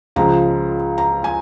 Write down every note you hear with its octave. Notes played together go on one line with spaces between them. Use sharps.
C#2 C#3 F3 G#3 A#5
A#5
G#5